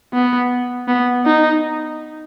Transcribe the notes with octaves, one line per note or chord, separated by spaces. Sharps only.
B3
B3
D#4